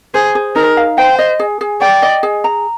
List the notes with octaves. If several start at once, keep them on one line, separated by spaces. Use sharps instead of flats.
G#4 C5
G#4
D#4 A#4
F5
C5 G5
D#5
G#4
G#4
D5 G5
D#5
G#4
A#5